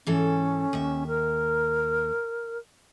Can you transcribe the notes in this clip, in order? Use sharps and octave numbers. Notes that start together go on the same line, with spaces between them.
G#2 E3 C#4 A4
D#2 E5
A#4